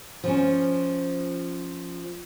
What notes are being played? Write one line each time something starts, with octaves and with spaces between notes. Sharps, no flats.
F3 C#4